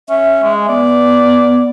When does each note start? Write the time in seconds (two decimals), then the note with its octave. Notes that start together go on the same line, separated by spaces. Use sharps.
0.09 C#4 E5
0.43 G#3
0.68 B3 D5